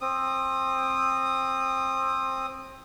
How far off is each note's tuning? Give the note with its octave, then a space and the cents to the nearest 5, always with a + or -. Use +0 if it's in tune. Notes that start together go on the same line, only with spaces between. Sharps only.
C4 +20 D#6 -15